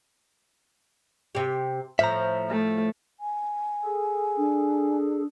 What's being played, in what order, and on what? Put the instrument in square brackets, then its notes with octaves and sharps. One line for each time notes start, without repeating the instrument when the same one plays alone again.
[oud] C3 G4
[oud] A2 F3 [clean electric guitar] E5 A#5
[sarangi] A3
[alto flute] G#5
[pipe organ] G#4 A4
[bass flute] D4